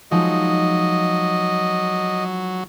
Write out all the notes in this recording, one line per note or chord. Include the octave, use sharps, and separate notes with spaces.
F3 F#3 G#3 D#4 D#5